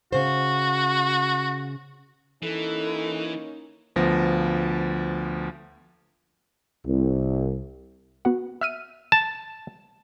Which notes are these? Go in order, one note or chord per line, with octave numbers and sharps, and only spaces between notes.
C#3 F#4 C5
E3 A#3 C#4 D#4 A4
D2 F3 B3 A#6
C2
B3 F#4 F#5
E5 F6 D#7
A5